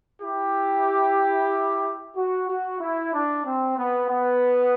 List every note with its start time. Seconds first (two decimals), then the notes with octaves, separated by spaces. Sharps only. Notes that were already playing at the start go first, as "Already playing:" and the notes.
0.22 E4 G4
2.16 F#4
2.49 F#4
2.80 E4
3.13 D4
3.45 C4
3.77 B3
4.09 B3